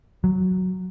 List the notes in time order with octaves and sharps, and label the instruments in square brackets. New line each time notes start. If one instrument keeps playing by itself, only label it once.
[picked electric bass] F#3